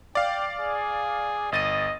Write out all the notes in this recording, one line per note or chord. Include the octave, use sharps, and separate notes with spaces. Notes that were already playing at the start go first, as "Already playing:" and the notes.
D5 F5 G5
G#4
G1 D#5 A6 D#7